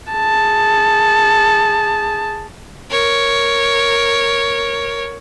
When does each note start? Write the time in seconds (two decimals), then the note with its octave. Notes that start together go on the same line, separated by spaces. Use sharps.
0.13 G#4 A5
2.90 A#4 C#5